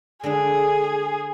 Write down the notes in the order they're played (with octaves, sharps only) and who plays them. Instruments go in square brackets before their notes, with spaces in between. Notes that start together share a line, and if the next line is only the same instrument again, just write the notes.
[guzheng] D3 G#3 D4 [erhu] G#4